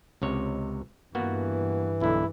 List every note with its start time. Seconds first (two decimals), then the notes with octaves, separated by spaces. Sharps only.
0.22 C#2 C3 C#5
1.15 G2 E3 A#3 B3 F#4
2.01 B1 D3 E4